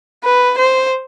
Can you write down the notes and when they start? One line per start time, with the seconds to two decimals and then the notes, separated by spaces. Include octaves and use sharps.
0.24 B4
0.58 C5